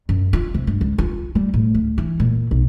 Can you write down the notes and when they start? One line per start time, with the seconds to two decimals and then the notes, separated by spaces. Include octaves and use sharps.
0.09 F#2
0.33 F4
0.54 C2
0.67 G2
0.81 C#2
0.98 F4
1.35 G3
1.54 A2
1.74 D2
1.98 E3
2.20 A#2
2.51 B1